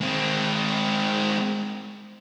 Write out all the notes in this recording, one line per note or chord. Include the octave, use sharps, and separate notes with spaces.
G#3 C4